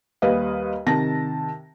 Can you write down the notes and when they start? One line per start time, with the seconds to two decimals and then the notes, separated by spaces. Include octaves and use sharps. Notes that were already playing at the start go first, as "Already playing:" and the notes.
0.22 D#2 G3 B4 D#5 F5
0.87 C3 D#3 A5 A#6